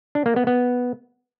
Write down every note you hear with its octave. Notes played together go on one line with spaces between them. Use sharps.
D4
A#3
B3
B3